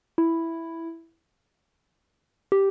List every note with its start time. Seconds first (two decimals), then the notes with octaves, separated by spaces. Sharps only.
0.18 E4
2.52 G4